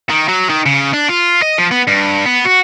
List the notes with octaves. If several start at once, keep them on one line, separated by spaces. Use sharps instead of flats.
D#3
F#3
D#3
C#3
D4
F4
D#5
F3
B3
G2
B3
F#4